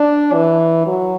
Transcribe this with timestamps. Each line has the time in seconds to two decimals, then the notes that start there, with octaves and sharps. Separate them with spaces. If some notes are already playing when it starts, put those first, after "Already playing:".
Already playing: D4
0.33 E3
0.87 F#3